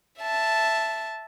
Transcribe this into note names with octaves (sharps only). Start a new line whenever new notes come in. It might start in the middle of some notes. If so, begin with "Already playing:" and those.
E5 A5